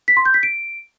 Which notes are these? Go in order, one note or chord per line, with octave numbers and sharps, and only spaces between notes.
B6
C6
G6
B6
D7